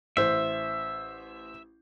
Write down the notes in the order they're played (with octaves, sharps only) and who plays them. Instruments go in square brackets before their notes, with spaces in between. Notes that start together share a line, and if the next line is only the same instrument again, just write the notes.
[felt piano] A1 C5 [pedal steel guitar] E5